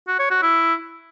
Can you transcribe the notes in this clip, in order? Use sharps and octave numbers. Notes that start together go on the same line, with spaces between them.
F#4
C#5
F#4
E4